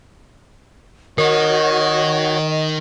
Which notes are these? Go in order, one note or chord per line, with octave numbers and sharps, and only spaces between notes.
D#3 F#4 A#4 C#5 D#5
D#5